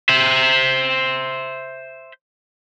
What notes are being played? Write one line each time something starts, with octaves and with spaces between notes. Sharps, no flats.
C5 E5